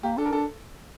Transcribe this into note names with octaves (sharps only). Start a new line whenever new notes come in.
A#3 G4
D4 A4
A#4
D4 A4